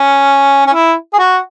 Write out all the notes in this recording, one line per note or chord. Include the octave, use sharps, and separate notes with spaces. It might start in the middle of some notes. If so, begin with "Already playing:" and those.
Already playing: C#4
C#4
E4
G#4
F#4